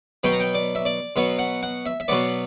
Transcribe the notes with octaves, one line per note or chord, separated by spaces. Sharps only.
B2 F#3 B3 G5
A#5
G5
D5
E5
D5
B2 F#3 B3
F#5
F#5
E5
E5
B2 F#3 B3 D5